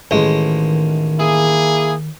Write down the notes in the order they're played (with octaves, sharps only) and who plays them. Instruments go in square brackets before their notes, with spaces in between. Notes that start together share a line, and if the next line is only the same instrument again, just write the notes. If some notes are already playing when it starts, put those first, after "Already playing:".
[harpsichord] A1 G#3 [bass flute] D#3
[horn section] A#3 E4 G#4